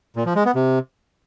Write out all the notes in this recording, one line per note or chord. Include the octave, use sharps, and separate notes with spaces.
A#2
F3
G#3
B3
C3